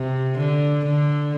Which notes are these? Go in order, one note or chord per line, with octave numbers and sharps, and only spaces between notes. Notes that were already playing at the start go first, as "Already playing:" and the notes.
Already playing: C3
D3
D3